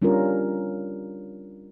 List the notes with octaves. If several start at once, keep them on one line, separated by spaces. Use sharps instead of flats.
G3 C#4 D4 F4 A#4